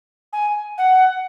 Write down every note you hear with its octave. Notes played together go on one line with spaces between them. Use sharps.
G#5
F#5